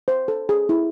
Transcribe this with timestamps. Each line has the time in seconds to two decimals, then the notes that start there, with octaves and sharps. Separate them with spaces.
0.08 C5
0.28 A4
0.49 G#4
0.69 E4